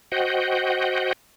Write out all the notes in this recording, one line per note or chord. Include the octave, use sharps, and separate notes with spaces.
F#4 C5 D#5 F#5 G5